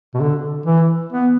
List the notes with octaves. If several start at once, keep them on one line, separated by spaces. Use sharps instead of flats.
B2
D3
E3
B3